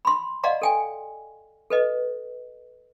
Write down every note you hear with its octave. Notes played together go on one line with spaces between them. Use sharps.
B5 C6
D5 D#5 F5 F#5 A#5 C6
A4 G5 G#5
A4 B4 D#5